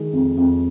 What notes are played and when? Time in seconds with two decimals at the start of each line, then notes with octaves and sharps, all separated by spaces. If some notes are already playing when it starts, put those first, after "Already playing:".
Already playing: D#3 G#3
0.13 F2
0.37 F2